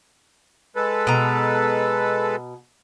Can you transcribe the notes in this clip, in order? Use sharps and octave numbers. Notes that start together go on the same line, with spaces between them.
G#3 A4 B4
B2 A#5